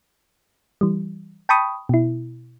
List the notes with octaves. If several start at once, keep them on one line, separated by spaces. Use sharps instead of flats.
E3 G3
G5 A5 B5 C#6 D#6
B2 E4